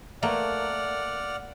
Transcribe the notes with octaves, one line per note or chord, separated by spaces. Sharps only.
A3 A#3 D5 F#5 F6